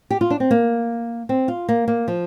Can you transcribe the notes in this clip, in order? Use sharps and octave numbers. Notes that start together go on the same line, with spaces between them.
G4
F4
D4
C4
A#3
C4
F4
A#3
A#3
F3